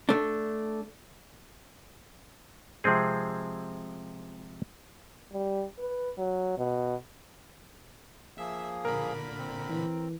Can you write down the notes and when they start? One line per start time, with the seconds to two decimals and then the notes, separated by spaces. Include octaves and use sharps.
0.09 A3 D4
2.84 C3 F3 G#3 C4 G#4
5.33 G3
5.79 B4
6.18 F#3
6.58 B2
8.38 F3 A#3 G#4 E5
8.85 A#2 D3 A#4 B5
9.38 C4
9.70 E3